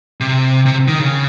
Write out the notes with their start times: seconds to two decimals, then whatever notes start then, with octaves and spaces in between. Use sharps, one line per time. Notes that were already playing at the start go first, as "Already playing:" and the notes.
0.20 C3
0.66 C3
0.88 D#3
0.99 C#3